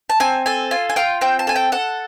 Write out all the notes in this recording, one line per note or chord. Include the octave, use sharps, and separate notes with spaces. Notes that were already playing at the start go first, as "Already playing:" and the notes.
A5
C4 G#5
A4 G#5
F4 G#5
G#5
F4 G5
C4 G5
A5
A4 G#5
G5
A4 F#5